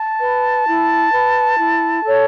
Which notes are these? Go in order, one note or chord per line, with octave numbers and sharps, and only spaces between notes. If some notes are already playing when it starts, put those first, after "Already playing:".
Already playing: A5
B4
E4
B4
E4
A4 C#5